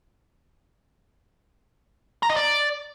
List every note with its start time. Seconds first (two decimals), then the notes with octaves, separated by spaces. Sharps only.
2.23 A#5
2.30 D#5
2.37 D5